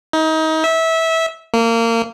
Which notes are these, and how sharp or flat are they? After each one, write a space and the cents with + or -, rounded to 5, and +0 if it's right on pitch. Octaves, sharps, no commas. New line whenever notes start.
D#4 +30
E5 -20
A#3 -25